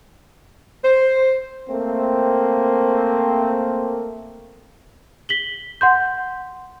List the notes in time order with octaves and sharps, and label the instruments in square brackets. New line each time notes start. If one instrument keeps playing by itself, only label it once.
[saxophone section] C5
[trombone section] A3 A#3 C4
[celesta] B6 F#7 G7
F#5 C6 G6